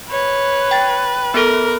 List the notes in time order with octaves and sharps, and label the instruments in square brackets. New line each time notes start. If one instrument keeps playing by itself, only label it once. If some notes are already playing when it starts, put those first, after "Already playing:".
[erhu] B4 [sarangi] C#5
[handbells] G5 A6
[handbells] B3 A4 [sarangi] A#4